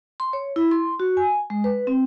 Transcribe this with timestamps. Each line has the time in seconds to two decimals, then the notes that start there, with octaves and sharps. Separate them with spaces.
0.20 C6
0.33 C#5
0.56 E4
0.71 C6
1.00 F#4
1.17 G#5
1.50 G#3
1.64 B4
1.87 C4